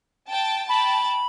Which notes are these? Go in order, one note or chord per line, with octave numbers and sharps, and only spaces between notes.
G5 A5
G5 A5 B5